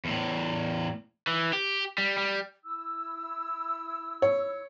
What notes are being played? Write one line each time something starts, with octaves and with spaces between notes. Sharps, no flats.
E2 A2
E3
G4
G3
G3
E4 E6
C#5